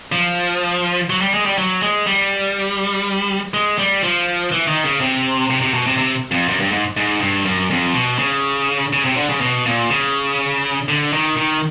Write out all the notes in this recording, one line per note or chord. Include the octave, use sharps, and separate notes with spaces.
F3
F#3
G3
G#3
G3
F#3
G#3
G3
G#3
G3
F3
E3
D#3
C#3
C3
C3
C3
B2
C3
C3
F2
F#2
G2
G#2
G#2
G2
F#2
F2
B2
C#3
C#3
C3
D3
C#3
B2
A#2
C#3
D3
D#3
D#3